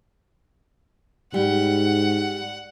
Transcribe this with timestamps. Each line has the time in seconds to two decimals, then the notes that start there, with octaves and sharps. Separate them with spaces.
1.34 G#2 G3 F#5